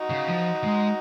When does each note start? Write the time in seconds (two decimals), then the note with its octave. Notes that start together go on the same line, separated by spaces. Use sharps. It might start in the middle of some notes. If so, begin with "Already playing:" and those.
Already playing: D#4 F#4
0.10 C#3
0.28 F3
0.64 G#3